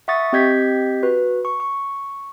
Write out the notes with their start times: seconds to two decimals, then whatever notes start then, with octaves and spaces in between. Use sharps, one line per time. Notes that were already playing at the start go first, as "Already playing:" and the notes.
0.08 E5 F#5 C#6 D#6 A6
0.33 C4 G4 D#5 G6 G#6 B6
1.03 F#4 B4
1.45 C#6
1.60 C#6